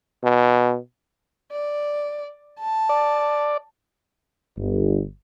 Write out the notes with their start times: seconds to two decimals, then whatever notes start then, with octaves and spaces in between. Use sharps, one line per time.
0.24 B2
1.52 D5
2.60 A5
2.89 D5
4.57 G1